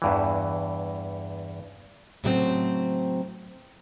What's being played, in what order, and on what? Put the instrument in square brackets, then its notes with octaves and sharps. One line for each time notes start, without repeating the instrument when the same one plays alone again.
[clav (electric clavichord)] E2 G2 E3
[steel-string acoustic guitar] A2 C#3 F#3 G3 C4 C5